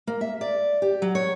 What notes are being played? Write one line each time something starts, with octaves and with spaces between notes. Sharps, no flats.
A#3
E5
D5
G4
F#3
C#5